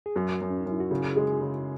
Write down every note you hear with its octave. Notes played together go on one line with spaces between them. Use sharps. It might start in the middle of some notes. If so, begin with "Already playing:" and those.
G#4
F#2 F#4
F#2
C#4
D#4
F#2
E4
F#4
C#3 G#4
G#3
C#3